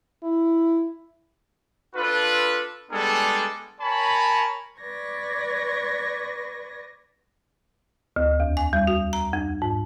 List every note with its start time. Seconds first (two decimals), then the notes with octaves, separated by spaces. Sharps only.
0.23 E4
1.95 D4 F4 A4 B4
2.91 G3 G#3 B3 D4 G#4 A4
3.81 A#4 C#5 G#5 A5 B5
4.81 B4 D5 C#6 G#6 A#6
8.16 D2
8.40 E2
8.57 G#5
8.73 G3
8.87 F#4
9.13 A#5
9.33 F2
9.62 G#2